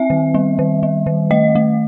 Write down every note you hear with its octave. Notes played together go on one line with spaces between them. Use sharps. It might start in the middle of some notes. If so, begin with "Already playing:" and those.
Already playing: C4 E5
D#3
G3
D#3
G3
D#3
A3 D#5
A3